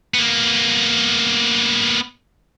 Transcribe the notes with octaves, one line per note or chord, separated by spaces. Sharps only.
A#3 B3